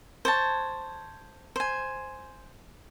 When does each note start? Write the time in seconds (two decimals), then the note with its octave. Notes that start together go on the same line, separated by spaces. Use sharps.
0.25 C5 C#5 A5
1.56 C5 G#5